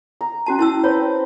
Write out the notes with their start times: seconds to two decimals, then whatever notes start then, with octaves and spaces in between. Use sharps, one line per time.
0.21 A#5
0.46 C#4 F#4 A5
0.59 E4 G5 A5 A#5 E6
0.84 C4 B4 C#5